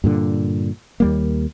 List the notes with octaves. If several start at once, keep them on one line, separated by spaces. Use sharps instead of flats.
G2 A#2 D3
D#2 G3 A#3